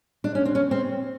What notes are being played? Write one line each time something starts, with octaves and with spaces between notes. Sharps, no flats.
D4
C#4
C4
C#4
C4